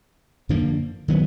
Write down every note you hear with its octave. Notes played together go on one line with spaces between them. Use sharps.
F#2 D3 F3 A#3
D#3 F#3 B3